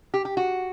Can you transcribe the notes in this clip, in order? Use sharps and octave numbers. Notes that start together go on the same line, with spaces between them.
G4
G4
F#4